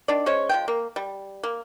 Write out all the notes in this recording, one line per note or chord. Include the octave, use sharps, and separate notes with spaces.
D#3 D4 D5
G#3 C#4 C5 C#5
F3 G#3 G5
A#3
G3
A#3